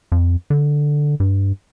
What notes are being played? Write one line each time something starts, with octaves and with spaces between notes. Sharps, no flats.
F2
D3
G2